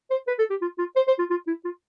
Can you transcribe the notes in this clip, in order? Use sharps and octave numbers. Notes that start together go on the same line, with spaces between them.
C5
B4
A4
G4
F4
F4
C5
C5
F4
F4
E4
F4